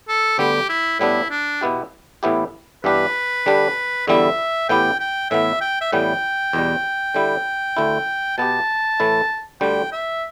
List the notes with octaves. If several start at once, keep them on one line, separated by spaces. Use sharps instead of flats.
A4
D2 D3 G3 B3 G4
E4
A2 G3 B3 D4 E4
D4
B2 B3 E4 G4
A2 E3 B3 E4 G4
G2 E3 B3 D4 G4 B4
D3 G3 D4 G4
E2 D3 G3 B3 E4 E5
A2 E3 B3 E4 G4 G5
G5
A2 E3 B3 E5
G5
E5
A2 E3 G3 B3 G5
E2 B2 G3
D3 G3 E4
D2 D3 A3 E4
B2 B3 G4 A5
A2 E3 A3 E4
D2 D3 G3 G5
E5